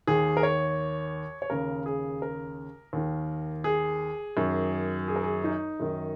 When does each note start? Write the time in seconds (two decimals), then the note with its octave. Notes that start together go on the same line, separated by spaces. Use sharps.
0.07 D#2 D#3 G#4
0.37 A#4
0.43 C#5
1.42 C#5
1.50 D#2 C#3 A#4
1.86 G#4
2.22 A#4
2.93 D#2 D#3
3.64 G#4
4.37 F#2 D#3
5.08 G#4
5.16 A#4
5.23 G#4
5.44 D#4
5.80 F#2 D#3